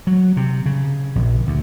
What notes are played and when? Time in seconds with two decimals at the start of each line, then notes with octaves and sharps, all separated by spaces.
0.07 F#3
0.37 C3
0.66 C#3
1.15 A#1
1.47 D2